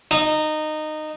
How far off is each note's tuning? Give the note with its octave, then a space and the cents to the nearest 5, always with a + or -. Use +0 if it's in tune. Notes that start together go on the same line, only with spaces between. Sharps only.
D#4 -15